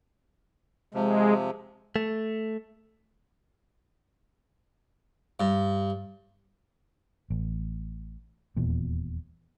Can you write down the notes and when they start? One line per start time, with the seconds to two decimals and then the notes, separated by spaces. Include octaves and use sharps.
0.94 C3 F3 G#3
1.96 A3
5.40 G2
7.30 A1
8.56 D#1 E2 A#2